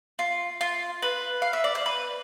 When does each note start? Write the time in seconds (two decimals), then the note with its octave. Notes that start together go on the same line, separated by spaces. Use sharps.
0.19 F4
0.61 F4
1.02 B4
1.42 F5
1.53 E5
1.64 D5
1.75 C5
1.86 B4